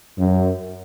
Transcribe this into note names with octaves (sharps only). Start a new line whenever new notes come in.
F#2